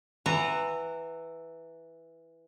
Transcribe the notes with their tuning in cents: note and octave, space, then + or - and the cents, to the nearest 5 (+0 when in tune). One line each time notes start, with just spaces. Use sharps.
E3 +0 F#5 +0 A#5 -25